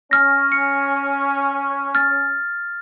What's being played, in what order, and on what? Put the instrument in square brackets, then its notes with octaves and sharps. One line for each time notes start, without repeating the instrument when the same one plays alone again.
[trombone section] C#4 [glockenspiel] F6 A#6
[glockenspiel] C#7
F6 A6